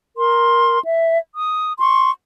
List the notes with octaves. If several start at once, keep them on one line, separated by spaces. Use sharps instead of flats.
A#4 C6
E5
D#6
C6 C#6